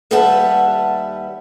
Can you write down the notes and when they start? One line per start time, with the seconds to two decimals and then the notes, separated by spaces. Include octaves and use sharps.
0.11 D#2 G3 B4 E5 F#5 A5